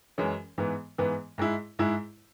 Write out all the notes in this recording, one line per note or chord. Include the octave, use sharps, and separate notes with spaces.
F#2 E3 G#3 C#4
G#2 E3 B3
G#2 E3 B3
G#2 G#3 E4
G#2 G#3 E4